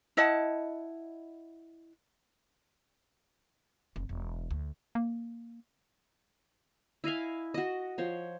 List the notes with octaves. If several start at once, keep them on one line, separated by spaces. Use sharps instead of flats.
E4 D#5 F#5 A5
F1
E1
D2
A#3
E4 D#5 F5 G#5
F#4 D#5
F3 C5 C#5